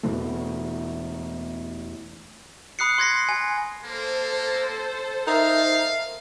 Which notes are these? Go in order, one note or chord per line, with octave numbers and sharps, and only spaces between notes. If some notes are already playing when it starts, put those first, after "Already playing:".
E2 B2 E3 A3
B5 D#6 F#6 C7 C#7
C6 G#6 A#6 C7
G#5
A#3 A4 C5
D#4 A#4 E5 F5